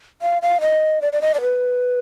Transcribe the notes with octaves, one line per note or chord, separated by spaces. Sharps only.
F5
F5
D#5
D5
D5
D#5
D5
B4